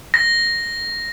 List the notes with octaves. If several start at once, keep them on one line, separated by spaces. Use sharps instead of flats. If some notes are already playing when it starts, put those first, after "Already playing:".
A#6